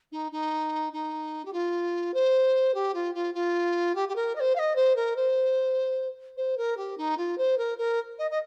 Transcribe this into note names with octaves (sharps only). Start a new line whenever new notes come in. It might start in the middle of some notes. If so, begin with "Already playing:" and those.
D#4
D#4
D#4
G4
F4
C5
G4
F4
F4
F4
G4
G4
A#4
D#5
C5
F5
D#5
C5
A#4
C5
C5
A#4
G4
D#4
F4
C5
A#4
A#4
D#5
D#5